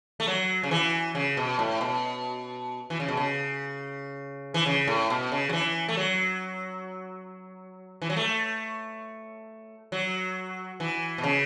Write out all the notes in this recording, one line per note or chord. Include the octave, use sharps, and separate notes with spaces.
A3
F#3
C#3
E3
C#3
B2
A2
B2
E3
C#3
B2
C#3
E3
C#3
A2
B2
C#3
F#3
E3
A3
F#3
E3
F#3
A3
F#3
E3
B2
C#3